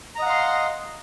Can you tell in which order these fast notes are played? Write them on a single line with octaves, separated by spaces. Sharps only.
A#5 D#5 F#5 F5 C6